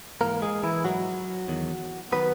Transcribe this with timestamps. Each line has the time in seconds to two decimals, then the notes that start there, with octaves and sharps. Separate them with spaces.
0.21 G#2 E3 A#3 A#4
0.42 G#3 G#4
0.63 E3 E4
0.84 G#2 E3 F#3 F#4
1.48 E2 D#3 F#3
2.12 D#3 F#3 B3 B4